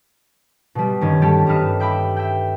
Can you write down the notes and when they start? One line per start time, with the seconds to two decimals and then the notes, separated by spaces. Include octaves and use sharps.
0.75 B2 G3
1.01 G2 D#3 C#4
1.22 G3 G4 A4
1.47 G2 G3 D#4 B4 F6 E7
1.80 E5 G5 B5 D6 E6
2.17 E5 G5